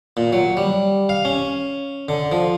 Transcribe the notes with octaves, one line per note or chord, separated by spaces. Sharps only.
A#2
F#3
G3
F5
C#4
D3
F3